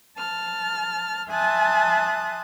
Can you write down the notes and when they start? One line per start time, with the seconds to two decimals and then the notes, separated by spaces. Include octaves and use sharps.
0.17 A5 F6
1.30 E5 G#5 A5 C6 D#6 F#6